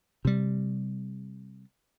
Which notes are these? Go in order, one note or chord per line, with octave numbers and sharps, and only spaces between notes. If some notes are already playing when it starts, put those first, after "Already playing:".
C3 G3